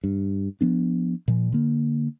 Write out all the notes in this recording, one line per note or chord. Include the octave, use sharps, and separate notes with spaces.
G2
F3 B3 D4
A#2 F3
D3 A#3